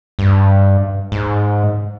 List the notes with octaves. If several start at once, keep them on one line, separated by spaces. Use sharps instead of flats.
G2
G#2